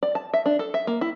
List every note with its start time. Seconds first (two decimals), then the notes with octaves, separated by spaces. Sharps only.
0.03 D5
0.15 A5
0.34 E5
0.46 D4
0.59 A4
0.74 E5
0.87 A#3
1.01 E4